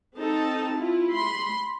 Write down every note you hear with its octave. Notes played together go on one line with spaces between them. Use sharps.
C4 D#4 A4 A5
E4 F4
B5 C6